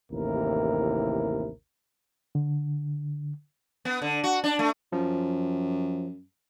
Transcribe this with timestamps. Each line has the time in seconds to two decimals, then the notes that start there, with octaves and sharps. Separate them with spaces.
0.11 A1 D#2 C3 E4 A#4
2.35 D3
3.85 B3
4.02 D3
4.24 F#4
4.44 D4
4.59 A3
4.92 F#2 F3